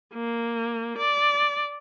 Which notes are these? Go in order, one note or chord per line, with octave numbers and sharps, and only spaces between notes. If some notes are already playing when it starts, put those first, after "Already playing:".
A#3
D5